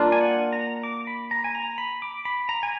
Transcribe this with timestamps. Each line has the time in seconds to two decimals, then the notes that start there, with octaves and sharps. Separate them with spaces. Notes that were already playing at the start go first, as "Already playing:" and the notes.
Already playing: A#3 D4 F4
0.12 G#5
0.21 F#5
0.53 A#5
0.83 D6
1.07 B5
1.31 A#5
1.44 G#5
1.55 A#5
1.78 B5
2.02 D6
2.25 B5
2.49 A#5
2.63 G#5